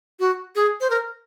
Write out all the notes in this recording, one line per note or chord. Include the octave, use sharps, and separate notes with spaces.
F#4
G#4
C5
A#4